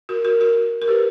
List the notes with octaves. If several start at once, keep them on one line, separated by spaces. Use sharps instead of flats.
F#4 A#4
F#4 A#4
F#4 A#4
A#4
G4 B4